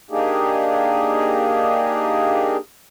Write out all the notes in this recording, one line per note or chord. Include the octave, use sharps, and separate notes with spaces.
A#3 D4 D#4 G4 G#4